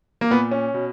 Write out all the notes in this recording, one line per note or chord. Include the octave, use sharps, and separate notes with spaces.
A#3
A#2 B3
C#4
B2